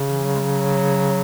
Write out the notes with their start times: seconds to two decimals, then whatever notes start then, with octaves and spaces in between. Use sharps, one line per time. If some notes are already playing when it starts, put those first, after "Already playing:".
Already playing: C#3
0.09 E3
0.24 F#3
0.35 G#3
0.40 F#3